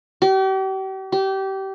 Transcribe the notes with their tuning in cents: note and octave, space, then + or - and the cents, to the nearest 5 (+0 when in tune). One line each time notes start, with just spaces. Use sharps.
G4 -40
G4 -25